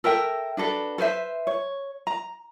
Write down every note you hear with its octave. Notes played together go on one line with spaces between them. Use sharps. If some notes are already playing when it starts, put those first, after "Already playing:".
A4 A#4 E5 G5
D4 F#4 A4 B4
A4 B4 C5 E5
C#5
A#5